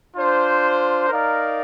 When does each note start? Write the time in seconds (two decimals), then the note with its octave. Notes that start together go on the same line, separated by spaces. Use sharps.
0.15 D4 F4 C5
1.09 D#4 A#4 D5 F5